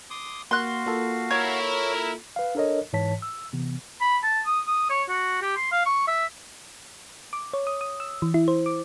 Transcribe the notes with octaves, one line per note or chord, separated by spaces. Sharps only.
C6 D6 D#6
A#3 F#4 F5 C6 F#6
A#3 F4 A4
E4 A#4 C#5
B4 F5
D4 A4 A#4 C#5 D#5
G#2 E3 C#5 A5 B6
E6
C3 E3 B3
B5
A5
D#6
D#6
C#5
F#4
G4
C6
F5
C#6
E5
D6
C#5
D#6
D#6
E6
E3
E4
C5
D6